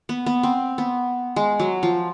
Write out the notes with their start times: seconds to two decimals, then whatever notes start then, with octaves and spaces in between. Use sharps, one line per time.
0.09 B3
0.26 B3
0.43 C4
0.78 B3
1.36 G#3
1.60 F#3
1.83 F3